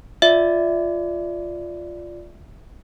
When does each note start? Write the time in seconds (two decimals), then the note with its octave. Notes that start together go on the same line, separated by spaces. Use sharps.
0.22 F4 D5 E5